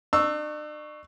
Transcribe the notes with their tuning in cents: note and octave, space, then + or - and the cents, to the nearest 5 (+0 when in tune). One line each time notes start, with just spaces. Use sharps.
D4 +45 C#6 +0 E6 +0